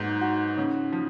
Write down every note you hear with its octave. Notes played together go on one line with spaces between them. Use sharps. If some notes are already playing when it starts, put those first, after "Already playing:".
Already playing: G#2 F#3 B3
F#4
C#3
F3